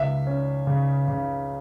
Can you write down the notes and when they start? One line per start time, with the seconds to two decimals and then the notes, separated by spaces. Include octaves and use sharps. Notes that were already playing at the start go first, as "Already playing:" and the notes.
Already playing: C#2 E5
0.27 C#4
0.67 C#3
1.08 C#3